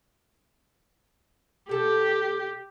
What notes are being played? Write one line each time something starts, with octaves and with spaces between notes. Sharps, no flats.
B2 G4 A4